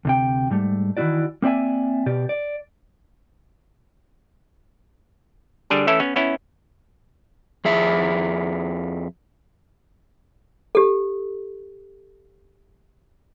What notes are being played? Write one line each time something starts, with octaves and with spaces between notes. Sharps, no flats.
D2 C3 G5
G#2 G3 A3
D#3 E3 F#3 E4 F#4 D5
A#3 C4 D5 E5 G#5
B2 G4 D5
D5
D3 G3 D4 G#4
E3 A3 C#4 E4 A4
B3 C#4
B3 C#4 E4
F2 G#4 E5
G4 A4